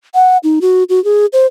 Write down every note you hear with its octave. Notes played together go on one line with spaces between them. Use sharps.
F#5
D#4
F#4
F#4
G#4
C5